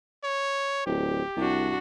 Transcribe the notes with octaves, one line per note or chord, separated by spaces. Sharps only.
C#5
D1 G4
C2 D4 F#4